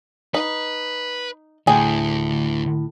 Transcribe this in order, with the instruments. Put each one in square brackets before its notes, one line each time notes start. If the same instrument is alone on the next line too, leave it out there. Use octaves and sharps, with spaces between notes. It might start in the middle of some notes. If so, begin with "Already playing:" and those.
[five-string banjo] D#4 [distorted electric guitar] B4
[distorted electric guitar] D2 [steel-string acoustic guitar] A2 [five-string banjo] G#4 G5